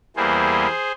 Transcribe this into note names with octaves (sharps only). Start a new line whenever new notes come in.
E2 E3 G3 A#3 G#4 C5